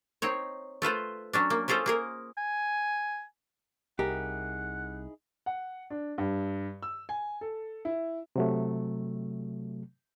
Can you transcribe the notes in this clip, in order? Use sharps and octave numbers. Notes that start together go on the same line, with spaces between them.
C4 D#4 C#5
A3 F4 B4 C5
F#3 C#4 D4
A#3
C#4 F4 G#4 A4 C5
A#3 G#4 A#4
G#5
C2 D#4 E4 G4 G#4 A#4 F#5
F#5
D4
G2
E6
G#5
A4
E4
C3 F#3 A3